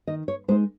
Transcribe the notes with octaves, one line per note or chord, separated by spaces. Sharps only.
D#3 D#5
C#5
G#3 D#4 C5